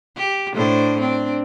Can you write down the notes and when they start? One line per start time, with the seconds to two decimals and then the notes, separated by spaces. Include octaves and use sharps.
0.17 G4
0.54 A2 D4 C5
0.99 C4 D4